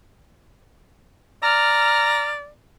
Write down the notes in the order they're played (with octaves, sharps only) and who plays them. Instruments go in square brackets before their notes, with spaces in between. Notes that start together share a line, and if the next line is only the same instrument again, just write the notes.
[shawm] D5 [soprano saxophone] A#5 [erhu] F6